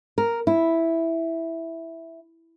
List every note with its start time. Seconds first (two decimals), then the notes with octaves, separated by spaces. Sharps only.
0.18 A#4
0.47 E4